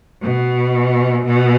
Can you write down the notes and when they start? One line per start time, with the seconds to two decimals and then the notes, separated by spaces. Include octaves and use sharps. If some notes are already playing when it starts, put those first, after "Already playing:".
0.22 B2
1.26 B2